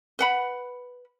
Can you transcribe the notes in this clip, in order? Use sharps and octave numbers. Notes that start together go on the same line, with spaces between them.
B4 F#5 B5